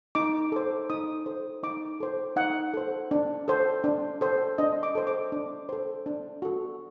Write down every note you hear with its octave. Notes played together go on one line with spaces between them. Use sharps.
D#4 D6
A4 C5
D#4 D#6
A4 C5
D#4 D6
A4 C5
D#4 F#5
A4 C5
D4
A4 C5
D4
A4 C5
D4 D#5
D6
A4 C5
D6
D4
A4 C5
D4
F#4 A4